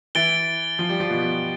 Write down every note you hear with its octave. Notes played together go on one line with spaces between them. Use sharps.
E3 E4 A6 D7 G7
F3 F4
G3 G4
F3 F4
B2 B3